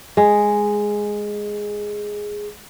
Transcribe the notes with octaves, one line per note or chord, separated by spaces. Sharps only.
G#3 G#4